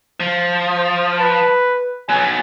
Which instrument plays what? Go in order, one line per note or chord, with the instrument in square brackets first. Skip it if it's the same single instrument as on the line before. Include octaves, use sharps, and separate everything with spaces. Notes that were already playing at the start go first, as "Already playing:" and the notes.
[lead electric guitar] F3
[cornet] B4
[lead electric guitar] F#3 B3 [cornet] G#5